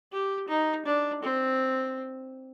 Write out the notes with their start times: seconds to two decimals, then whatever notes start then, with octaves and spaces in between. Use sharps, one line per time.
0.12 G4
0.48 D#4
0.86 D4
1.22 C4